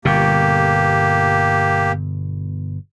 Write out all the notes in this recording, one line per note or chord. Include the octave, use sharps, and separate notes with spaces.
G1 B2 A#3 G4